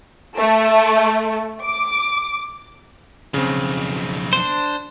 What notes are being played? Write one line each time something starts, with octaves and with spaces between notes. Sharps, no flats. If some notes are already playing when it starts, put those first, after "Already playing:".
A3
D6
B1 F2 C#3 C4
D4 C5